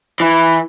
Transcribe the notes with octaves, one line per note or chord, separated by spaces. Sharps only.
E3